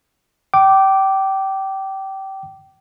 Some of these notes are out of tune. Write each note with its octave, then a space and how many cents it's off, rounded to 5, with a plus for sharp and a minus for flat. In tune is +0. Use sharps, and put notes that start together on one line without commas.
G5 -25 D6 +0